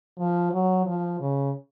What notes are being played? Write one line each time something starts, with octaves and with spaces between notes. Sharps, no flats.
F3
F#3
F3
C#3